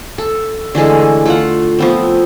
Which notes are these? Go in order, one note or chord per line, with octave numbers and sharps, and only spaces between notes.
A4
D3 E3 G#3 A3
A3 F4 F#5
F3 B3 C4